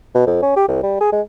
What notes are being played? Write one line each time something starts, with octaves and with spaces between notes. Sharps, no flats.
B2
F2
C#4
G4
C2
G3
G#4
G#3